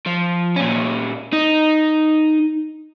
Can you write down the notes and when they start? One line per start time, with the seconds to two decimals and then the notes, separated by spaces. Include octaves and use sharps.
0.06 F3
0.56 A#2 C#4
1.33 D#4